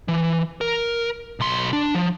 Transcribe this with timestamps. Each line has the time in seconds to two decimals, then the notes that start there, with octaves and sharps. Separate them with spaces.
0.08 E3
0.61 A#4
1.40 B1 C6
1.73 D4
1.95 F3